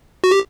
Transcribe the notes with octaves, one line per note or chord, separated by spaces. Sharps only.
F#4
G4